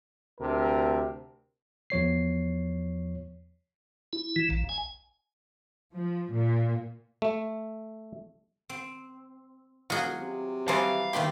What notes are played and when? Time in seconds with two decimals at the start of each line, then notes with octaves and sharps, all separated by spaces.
0.39 D2 C3 A4 A#4
1.90 E2 F3 C#5 C7
4.13 E4
4.36 E3
4.50 A#1
4.69 G#5
5.93 F3
6.32 A#2
7.22 A3
8.69 C4
9.90 E1 F#3 F4 G#4 D#5 F#5
10.21 C3
10.68 E3 F#3 G3 G#4 C5 F5 A5
11.13 D#2 D#3 A3 B3 G4 C6